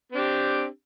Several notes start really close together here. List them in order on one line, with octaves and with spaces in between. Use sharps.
C4 D4 G4